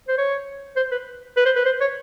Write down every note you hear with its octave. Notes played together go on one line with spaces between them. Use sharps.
C5
C#5
C5
B4
B4
C5
B4
C5
C#5